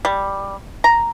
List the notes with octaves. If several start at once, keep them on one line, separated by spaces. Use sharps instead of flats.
G3
A#5